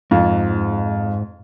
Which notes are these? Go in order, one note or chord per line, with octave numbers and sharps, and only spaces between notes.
F2 G#2